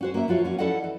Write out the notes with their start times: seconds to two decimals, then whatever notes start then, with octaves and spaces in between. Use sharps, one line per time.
0.01 C#4 F#4 C5
0.14 A#3 E5
0.28 F3 F4 F#4 C#5
0.45 A#3 C#4
0.58 F3 E4 A4 D5 D#5 F#5
0.84 E3